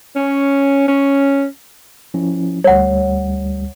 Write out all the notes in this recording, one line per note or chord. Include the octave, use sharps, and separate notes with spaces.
C#4
C#4
F3 C#4 E4
D2 G3 C#5 F#5